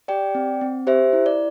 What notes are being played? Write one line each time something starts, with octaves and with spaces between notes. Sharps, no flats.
G4 D5 G5
C4
C4
G4 C5 E5
E4
D5